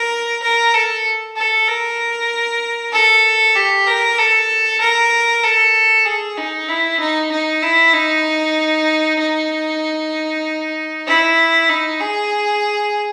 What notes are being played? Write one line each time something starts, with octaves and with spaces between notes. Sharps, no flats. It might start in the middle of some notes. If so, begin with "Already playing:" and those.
Already playing: A#4
A#4
A4
A4
A#4
A4
G4
A#4
A4
A#4
A4
G#4
D#4
E4
D#4
D#4
E4
D#4
D#4
E4
D#4
G#4